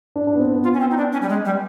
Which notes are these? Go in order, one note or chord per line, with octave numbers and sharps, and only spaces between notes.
D4
D4
B3
C4
B3
F4
C#4
C4
D#4
D4
C#4
G3
G#3
G3